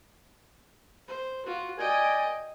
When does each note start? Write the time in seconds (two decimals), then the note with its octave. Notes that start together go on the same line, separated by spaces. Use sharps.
1.08 C5
1.46 F4 F#4
1.79 A#4 D5 D#5 G5 G#5